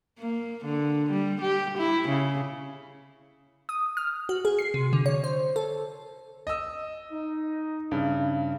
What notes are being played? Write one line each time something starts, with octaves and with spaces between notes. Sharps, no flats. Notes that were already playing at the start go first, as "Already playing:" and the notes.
A#3
D3
G3
G4
E4
C#3
D#6
F6
F#4
G#4
C7
C3
D3
C#5
C5
A4
D#5 E6
D#4
G2 C#3